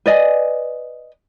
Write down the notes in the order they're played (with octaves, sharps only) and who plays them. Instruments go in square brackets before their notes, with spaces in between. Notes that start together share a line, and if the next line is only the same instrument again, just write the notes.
[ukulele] B4 D5 D#5 G#5